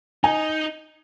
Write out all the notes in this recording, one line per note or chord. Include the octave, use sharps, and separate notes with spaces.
D#4 G#5